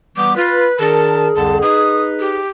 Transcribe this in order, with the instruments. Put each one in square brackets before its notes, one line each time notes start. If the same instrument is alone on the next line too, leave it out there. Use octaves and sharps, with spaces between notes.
[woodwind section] E3 G3 B3 [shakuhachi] D6
[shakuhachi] F4 [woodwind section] B4
[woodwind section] D#3 D4 A#4 [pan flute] G#4 [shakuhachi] A5
[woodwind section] C2 F2 D3 [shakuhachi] A5
[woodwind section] D#4 B4 [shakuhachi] D#6
[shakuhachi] G4